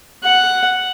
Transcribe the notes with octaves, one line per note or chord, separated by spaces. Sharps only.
F#5